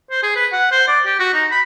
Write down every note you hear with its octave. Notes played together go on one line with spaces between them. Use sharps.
C5
G#4
B4
F#5
C5
D5
G4
F#4
D#4
B5